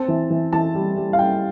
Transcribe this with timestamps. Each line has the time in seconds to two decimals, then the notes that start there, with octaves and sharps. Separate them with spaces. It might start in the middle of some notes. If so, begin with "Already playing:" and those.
Already playing: C4 A5
0.08 E3
0.30 E3
0.53 E3 A5
0.75 G3
0.97 G3
1.13 F5
1.19 G3 G5